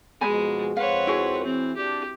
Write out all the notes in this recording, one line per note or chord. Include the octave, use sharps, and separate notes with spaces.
F2 B2 G#3 G#5 A#5 B5
F2 C4 B4 C#5 F5 F#5
E4 F#4 G#4
E3 C4
D4 G4